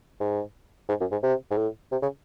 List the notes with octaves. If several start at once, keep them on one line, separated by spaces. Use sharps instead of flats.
G#2
G#2
F#2
G#2
C3
G#2
A2
C3
C#3